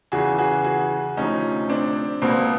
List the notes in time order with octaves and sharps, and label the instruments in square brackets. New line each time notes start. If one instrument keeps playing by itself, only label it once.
[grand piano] E2 C#3 E3 F#4 G#4
F#4 G#4
F#4 G#4
D2 C3 F3 C#4 D#4
C4 D4
C#2 B2 A#3 C4